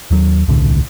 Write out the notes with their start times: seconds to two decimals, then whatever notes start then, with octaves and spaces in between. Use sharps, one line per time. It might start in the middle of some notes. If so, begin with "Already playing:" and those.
0.11 D#2 F#3
0.48 D#1 C2 A2 D3